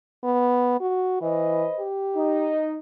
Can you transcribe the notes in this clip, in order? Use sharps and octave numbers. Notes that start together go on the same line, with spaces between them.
B3
F#4
E3 B4 C5 D#5
G4
D#4